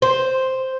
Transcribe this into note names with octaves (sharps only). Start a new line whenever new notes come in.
C5